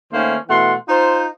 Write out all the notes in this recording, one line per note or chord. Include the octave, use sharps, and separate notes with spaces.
D#3 A3 A#3 C#4 C5
B2 E3 A3 F#5 C6
D#4 F4 C5